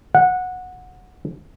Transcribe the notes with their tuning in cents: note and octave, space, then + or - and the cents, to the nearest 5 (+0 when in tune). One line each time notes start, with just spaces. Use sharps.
F#5 -15